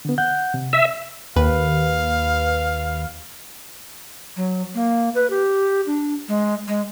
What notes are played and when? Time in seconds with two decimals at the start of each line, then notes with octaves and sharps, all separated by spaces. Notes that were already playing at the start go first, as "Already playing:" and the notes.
0.05 D3 B3
0.18 F#5 F#6 G6
0.54 C3
0.73 E5
1.36 D#2 B4 F5
4.36 F#3
4.75 A#3
5.15 B4
5.30 G4
5.87 D4
6.28 G#3
6.68 G#3